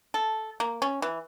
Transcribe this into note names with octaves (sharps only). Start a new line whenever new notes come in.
A4
A#3
C#4
E3